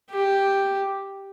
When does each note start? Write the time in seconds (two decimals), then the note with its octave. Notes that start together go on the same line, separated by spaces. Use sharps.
0.10 G4